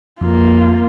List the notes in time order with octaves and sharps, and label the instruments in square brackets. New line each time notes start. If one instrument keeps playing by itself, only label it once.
[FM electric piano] F2 [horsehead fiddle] A#3 F4